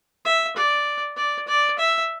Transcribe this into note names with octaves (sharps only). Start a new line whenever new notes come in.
E5
D5
D5
D5
E5